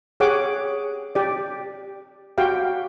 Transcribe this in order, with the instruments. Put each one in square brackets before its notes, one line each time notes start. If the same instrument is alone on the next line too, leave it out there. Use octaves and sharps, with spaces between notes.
[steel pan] G4 G#4 C#5 F#5 D6
G4 D5
F#4 G4 F5 G5